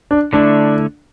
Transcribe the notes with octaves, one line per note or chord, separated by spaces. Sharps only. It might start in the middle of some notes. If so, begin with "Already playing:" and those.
D4
D3 A3 D4 E4